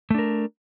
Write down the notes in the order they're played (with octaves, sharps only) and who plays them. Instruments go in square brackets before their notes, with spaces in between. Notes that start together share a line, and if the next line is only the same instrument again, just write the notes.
[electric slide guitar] A3
D4
A#4